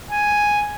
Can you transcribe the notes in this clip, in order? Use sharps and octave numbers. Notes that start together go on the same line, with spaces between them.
G#5